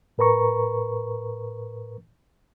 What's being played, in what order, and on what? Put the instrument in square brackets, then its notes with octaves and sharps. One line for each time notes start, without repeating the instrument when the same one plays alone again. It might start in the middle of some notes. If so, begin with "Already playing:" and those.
[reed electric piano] A2 A#4 B4 A#5 C#6